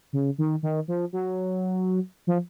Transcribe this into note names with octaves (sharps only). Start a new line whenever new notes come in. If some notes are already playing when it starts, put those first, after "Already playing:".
C#3
D#3
D#3
F3
F#3
F3